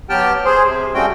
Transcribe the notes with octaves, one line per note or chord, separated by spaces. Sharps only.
F#3 B3 G4 G5 A5 F6
G#4 C5
C3
G3 A3 C#4 F#4 G5